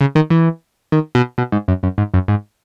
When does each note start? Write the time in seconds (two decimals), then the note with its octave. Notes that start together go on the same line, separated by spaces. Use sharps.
0.01 C#3
0.15 D#3
0.30 E3
0.92 D#3
1.15 B2
1.38 B2
1.52 G#2
1.68 F#2
1.83 F#2
1.98 G#2
2.14 F#2
2.28 G#2